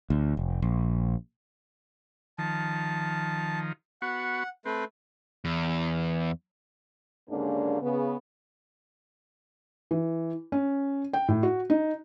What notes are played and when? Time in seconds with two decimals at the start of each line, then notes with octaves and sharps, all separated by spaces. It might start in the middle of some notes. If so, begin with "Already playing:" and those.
0.10 D2
0.37 F1
0.62 A#1
2.38 D#3 F3 A5
4.02 B3 F#4 F#5 C#6
4.65 A3 C4 B4
5.45 E2
7.29 D#2 G#2 D3 A#3 C#4 D4
7.81 C#3 B3
9.91 E3
10.52 C#4
11.13 G5
11.28 A2
11.43 F#4
11.70 D#4